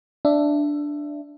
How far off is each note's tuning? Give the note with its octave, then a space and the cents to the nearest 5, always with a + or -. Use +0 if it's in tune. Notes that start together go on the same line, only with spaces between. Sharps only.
D4 +0 E5 +15